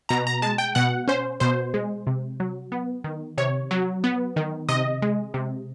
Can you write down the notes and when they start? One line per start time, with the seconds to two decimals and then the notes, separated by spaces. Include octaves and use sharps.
0.09 B2 A#5
0.27 A#5
0.42 G#3 A5
0.58 G5
0.75 B2 F#5
1.08 C#4 C5
1.40 B2 C5
1.74 G#3
2.07 C3
2.40 F#3
2.72 B3
3.04 D#3
3.37 C3 C#5
3.71 F#3
4.04 B3
4.36 D#3
4.69 C3 D#5
5.02 G#3
5.34 C3